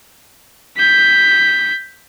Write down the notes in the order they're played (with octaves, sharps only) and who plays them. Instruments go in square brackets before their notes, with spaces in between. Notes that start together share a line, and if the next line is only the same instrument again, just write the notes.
[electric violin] G6 B6